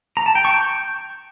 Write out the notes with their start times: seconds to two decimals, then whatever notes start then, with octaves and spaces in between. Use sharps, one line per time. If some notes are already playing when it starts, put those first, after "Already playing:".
0.17 A#5
0.26 A5
0.35 G5
0.45 C#6
0.54 G6